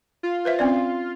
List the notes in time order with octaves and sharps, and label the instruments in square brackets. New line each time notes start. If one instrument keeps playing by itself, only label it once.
[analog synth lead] F4
[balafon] B4 C5 E5
C4 C#4 D5